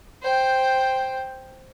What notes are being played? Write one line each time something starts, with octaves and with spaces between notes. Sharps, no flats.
C5 G5